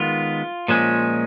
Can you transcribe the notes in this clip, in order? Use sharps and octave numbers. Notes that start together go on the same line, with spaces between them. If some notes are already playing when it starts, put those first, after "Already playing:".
Already playing: D#3 G#3 B3 F4
A#2 F3 G#3 C#4